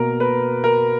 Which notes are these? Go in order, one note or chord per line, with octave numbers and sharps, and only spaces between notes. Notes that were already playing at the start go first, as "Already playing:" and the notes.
Already playing: B2 A#3 A#4
B4
A#4